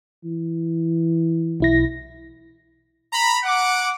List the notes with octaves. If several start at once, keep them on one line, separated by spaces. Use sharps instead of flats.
E3
B1 E4 A#6
A#5 B5
F#5 D6